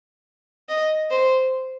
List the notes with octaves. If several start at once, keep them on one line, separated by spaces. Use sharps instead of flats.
D#5
C5